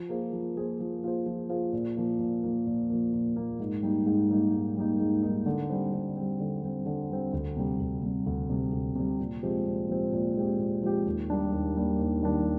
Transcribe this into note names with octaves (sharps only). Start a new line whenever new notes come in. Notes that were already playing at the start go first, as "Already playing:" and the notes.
Already playing: F3
A#3 F4 G#4 C5
F3
A#3 F4 G#4 C5
F3
A#3 F4 G#4 C5
F3
A#3 F4 G#4 C5
A#2
F3 A#3
A#2
F3 A#3
A#2
F3 A#3
A#2
F3 A#3
G#2
G3 A#3 D#4
G#2
G3 A#3 D#4
G#2
G3 A#3 D#4
G#2
G3 A#3 D#4
D3
G3 C4
D3
G3 C4
D3
G3 C4
D3
G3 C4
D2
C3 G3
D2
C3 G3
D2
C3 G3
D2
C3 G3
A#2
F3 G#3 C4 G4
A#2
F3 G#3 C4 G4
A#2
F3 G#3 C4 G4
A#2
F3 G#3 C4 G4
D#2
D#3 G3 A#3 D4
D#2
D#3 G3 A#3 D4
D#2
D#3 G3 A#3 D4